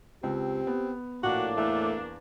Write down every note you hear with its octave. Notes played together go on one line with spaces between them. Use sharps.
C#2 C4 G4
B3
A#1 A2 A#3 D4 F#4
E2 A3